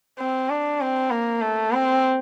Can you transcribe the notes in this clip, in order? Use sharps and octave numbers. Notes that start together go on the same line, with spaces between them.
C4
D4
C4
A#3
A3
C4